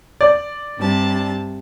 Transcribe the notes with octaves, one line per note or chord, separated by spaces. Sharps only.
D5
G2 C3 A5